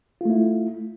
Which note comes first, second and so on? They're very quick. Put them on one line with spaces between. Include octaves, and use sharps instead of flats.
F4 A3 E4